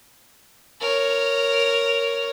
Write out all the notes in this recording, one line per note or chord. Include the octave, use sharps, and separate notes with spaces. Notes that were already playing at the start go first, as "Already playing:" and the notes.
A#4 C#5